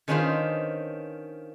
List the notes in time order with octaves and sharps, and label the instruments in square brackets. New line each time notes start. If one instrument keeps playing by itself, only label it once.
[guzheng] D#3 C#4 D4 F4 B4 C5